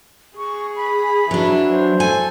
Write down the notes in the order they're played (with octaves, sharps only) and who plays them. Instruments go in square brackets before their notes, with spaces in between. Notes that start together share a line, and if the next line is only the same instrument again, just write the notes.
[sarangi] G#4 [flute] C#6
[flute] B5
[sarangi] E3 [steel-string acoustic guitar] F#3 D4
[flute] C5
[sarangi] A4 [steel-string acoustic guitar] G#5